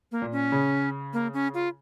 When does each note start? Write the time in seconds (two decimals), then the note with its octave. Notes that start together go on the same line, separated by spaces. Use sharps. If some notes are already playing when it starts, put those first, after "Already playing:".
0.12 A#3
0.22 A#2
0.32 C#4
0.52 C#3
1.13 A#3
1.34 C#4
1.54 F4